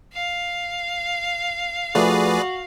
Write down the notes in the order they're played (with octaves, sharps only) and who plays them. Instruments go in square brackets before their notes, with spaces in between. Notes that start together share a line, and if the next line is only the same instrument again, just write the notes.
[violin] F5
[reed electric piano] F3 A3 F4 [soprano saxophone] F#4 [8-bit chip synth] G#4 B4 D5